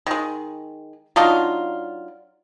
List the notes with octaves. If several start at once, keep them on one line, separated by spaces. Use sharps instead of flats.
D#3 G#3
F#3 D4 D#4 F4